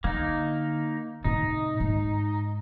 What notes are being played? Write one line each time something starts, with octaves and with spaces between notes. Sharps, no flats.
D3 A#3 D#4
A2 C3 D#4
G#2